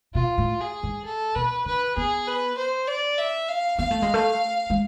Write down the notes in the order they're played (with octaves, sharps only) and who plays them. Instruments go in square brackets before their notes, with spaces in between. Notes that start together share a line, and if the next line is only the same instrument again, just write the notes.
[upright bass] B2 [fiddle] F4
[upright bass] A2
[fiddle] G#4
[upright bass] G#2
[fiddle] A4
[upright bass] B2 [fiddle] B4
[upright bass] D3 [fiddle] B4
[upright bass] B3 [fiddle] G#4
[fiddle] B4
C5
D5
E5
F5
[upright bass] B3 [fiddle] F5
[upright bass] A3
G#3
A3
G#3